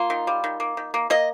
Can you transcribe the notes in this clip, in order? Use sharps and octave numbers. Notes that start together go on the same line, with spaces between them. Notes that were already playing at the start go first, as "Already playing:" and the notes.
Already playing: A#3 F4
D#3
G3
D#3
A#3
D#3
A#3
A#3 D#5